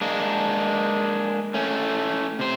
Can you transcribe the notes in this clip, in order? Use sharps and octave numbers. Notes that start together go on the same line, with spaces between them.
G#3 A#3 D4
A3 C#4
C3 C5